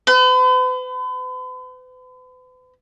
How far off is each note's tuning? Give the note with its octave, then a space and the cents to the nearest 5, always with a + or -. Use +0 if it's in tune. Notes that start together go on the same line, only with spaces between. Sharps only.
B4 +45